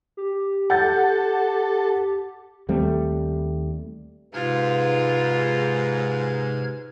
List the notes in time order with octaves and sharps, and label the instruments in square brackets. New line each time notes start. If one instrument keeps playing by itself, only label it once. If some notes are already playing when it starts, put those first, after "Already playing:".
[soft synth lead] G4
[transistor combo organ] A4 [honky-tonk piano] F#5 G6 A6
[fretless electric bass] D#2 G3 A3 C4
[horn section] G#2 [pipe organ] C3 F6 G#6 [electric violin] F4 [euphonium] B4